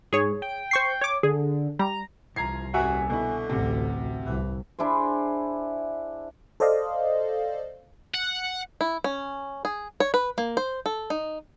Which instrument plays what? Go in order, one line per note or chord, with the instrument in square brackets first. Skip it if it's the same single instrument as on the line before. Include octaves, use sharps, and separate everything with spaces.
[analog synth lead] G#2 [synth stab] G#4 C#5
[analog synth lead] G5
[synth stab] C5 C#6 C7
C#5 D6
[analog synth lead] D3 [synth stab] G#4
[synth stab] G3 [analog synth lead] A#5
[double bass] C2 [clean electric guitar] E3 F3 [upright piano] A#5 G#6 C7
[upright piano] D#1 E5 [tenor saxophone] F#4 [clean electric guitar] G#5
[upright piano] B2 E4 [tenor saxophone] D3
[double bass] A1 D2 [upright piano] C3 [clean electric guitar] C4 F#4 F#5
[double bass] C2 [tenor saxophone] E3
[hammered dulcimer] D4 E4 G#4 C5
[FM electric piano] A4 C5 D5 D#5 F5
[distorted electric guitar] F#5
[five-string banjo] E4
C#4
G#4
C#5
B4
A#3
C5
A4
D#4